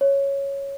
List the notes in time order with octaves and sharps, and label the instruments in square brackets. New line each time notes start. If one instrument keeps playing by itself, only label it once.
[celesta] C#5